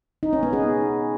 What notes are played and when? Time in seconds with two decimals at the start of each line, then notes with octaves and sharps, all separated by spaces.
0.23 D#4
0.33 C#4
0.43 B3
0.53 G#4